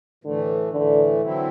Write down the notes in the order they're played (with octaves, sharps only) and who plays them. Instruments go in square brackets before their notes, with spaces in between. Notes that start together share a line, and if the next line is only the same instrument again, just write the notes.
[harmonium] A2 E3 A3 [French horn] D3
[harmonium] A2 E3 A3 [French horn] D3
[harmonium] D3 F#3 C4 E4